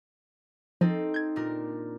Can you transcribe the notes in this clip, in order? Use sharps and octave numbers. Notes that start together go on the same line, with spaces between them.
F3 C4 D#4 A4
G6 G#6
A#2 D4 A#4